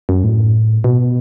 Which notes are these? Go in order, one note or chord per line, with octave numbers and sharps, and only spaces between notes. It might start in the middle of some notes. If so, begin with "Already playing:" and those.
F#2
A2
B2